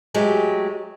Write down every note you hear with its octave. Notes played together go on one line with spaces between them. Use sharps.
F#3 G#3 A3 G4